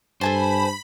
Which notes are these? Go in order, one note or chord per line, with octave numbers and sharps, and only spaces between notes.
G2 A4 C5 G#5 A5 B5